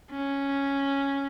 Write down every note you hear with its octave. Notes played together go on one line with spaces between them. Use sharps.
C#4